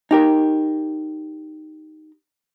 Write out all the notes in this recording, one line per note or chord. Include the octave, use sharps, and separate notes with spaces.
D#4 G4 A#4